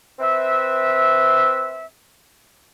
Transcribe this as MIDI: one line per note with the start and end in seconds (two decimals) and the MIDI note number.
0.19 1.85 60
0.19 1.85 71
0.19 1.85 76